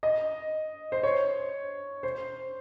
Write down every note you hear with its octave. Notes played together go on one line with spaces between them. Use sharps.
D#5
C5
C#5
C5